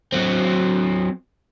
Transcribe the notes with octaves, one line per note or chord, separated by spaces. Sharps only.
F#3 C4